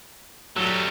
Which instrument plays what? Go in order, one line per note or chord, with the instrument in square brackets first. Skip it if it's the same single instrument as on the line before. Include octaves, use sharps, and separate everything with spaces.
[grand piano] F#3 [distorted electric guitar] G3 A3